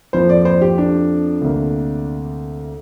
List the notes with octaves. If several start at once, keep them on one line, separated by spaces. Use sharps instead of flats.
F2 F3 A#3 C5
D5
C5
G4
D4
D2 C3 A#3